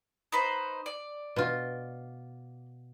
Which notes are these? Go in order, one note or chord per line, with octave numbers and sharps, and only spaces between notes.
D#4 B4 C5
D5
B2 F4